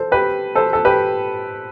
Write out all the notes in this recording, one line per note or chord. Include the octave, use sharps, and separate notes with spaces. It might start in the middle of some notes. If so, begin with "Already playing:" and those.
Already playing: A4 C5
G4 B4
A4 C5
A4
G4 B4